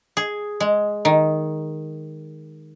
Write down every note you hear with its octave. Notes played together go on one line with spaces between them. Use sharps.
G#4
G#3
D#3